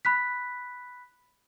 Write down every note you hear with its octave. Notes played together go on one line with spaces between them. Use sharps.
B5 F#6 B6